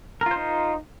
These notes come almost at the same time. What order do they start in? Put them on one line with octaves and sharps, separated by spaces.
A#4 F4 C5 D#4